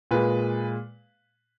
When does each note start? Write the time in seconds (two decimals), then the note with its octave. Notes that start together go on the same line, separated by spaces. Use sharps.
0.11 A#2 G#3 B4